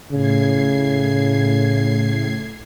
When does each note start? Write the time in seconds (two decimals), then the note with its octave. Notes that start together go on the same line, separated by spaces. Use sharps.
0.12 A2 C#3 G#6 C7